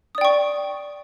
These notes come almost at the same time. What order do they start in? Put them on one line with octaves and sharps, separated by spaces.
D#6 D5 G5 C#6